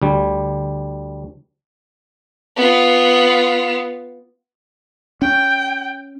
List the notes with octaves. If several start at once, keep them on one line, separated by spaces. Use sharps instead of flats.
D2 G3
B3 F4
C#4 G5